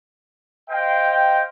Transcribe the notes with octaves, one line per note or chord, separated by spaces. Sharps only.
C5 D#5 F5 G5